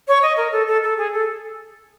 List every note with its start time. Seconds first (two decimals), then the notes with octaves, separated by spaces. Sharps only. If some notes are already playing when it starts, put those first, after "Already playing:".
0.08 C#5
0.23 D#5
0.37 A#4
0.52 A4
0.67 A4
0.83 A4
0.97 G#4
1.13 A4